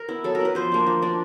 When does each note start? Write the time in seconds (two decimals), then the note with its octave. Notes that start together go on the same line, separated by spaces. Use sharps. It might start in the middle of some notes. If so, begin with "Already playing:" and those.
Already playing: A#4
0.08 B3 E4
0.24 F#3 A4
0.35 A#4
0.40 B3 E4 B4
0.55 F3 C5
0.72 A#3 D4
0.87 F3
1.02 A#3 D4